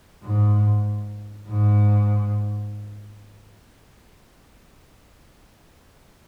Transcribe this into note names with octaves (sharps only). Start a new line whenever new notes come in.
G#2
G#2